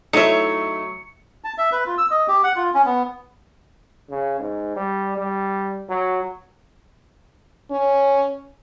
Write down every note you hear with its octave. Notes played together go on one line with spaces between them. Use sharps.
F#3 A3 D#4 E4 C#5 E5 C#7
A5
E5
B4
F4
E6
D#5
G4
F#5
F4
C#4
B3
C#3
G#2
G3
G3
F#3
C#4